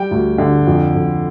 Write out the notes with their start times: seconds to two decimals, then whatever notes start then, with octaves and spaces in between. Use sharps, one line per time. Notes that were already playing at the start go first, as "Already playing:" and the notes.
Already playing: G3 G5
0.11 D2
0.38 D3
0.66 F2
0.94 F2